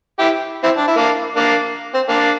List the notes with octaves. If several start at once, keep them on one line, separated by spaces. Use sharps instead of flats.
E4 G4
C4 E4
D4
E4
A#3 D4
A#3 D4
C4
A#3 D4